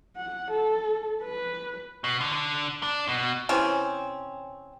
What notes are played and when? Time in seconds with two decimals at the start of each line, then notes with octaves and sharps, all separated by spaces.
0.16 F#5
0.51 A4
1.24 B4
2.04 B2
2.21 D3
2.32 D3
2.83 D4
3.09 B2
3.49 C3 E3 C4 C#4